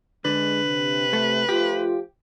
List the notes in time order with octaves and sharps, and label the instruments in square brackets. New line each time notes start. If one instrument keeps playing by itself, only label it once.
[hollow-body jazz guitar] D3 [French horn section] G#3 [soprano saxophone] B4
[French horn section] C3
[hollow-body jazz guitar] A3
[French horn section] F3 A3 F4 [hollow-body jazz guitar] G4